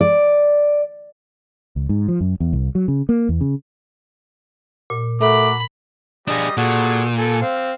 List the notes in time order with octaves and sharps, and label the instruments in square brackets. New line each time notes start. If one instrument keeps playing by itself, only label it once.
[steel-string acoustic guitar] D5
[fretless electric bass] C#2
G#2
F3
F#2
E2
C2
F#3
C#3
A#3
E2
C#3
[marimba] A#2
[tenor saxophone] A3 [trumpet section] F#4 A#4 D6 [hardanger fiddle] B5
[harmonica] G3 D#5 [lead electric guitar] D4 G#4
[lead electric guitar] A#2 [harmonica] F#4 G#4 A4
[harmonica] A4 G#5
C4 F5